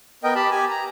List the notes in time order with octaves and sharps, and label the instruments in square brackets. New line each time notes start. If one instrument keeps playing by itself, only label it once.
[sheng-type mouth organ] B3 A#4 D#5 G5
G4 A5 B5
G4 G#5
A#5